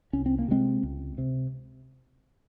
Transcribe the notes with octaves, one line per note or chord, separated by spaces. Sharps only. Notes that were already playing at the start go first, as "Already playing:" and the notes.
C2 C#4
C4
A#3
C3 G#3 C4
C#2
C3